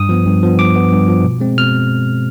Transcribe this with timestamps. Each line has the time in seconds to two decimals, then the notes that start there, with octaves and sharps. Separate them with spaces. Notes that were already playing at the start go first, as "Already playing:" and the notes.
Already playing: G2 D#6
0.09 F3 B3
0.26 G2
0.43 F3 B3
0.59 G2 D6
0.76 F3 B3
0.92 G2
1.08 F3 B3
1.24 B2
1.40 G#3 C4
1.57 B2 F6